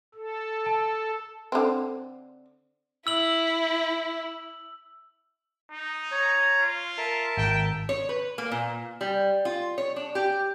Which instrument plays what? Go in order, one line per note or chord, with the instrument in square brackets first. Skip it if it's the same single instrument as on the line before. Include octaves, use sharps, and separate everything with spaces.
[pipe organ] A4
[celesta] A5
[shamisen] D3 C4
[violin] E4 [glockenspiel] E6 F#7
[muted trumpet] D#4
[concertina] C#5 A#5
[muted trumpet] F4
[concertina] A#4 E5 A5
[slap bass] G#1 [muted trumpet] G5
[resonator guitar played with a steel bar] C#5
B4
A#3
A#2
G3
F4
C#5
D4
G4